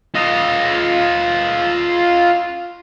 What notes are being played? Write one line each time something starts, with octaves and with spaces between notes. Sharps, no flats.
F4 D#5